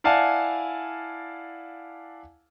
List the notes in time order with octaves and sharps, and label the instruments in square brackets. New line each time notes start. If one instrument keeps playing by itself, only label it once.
[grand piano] E4 D5 F5 F#5 G#5 A5